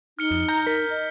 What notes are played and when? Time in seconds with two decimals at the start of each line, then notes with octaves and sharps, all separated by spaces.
0.19 D#4 F6 C#7 G7
0.31 F2
0.48 A#5 G6
0.67 A#4 B6
0.90 D#5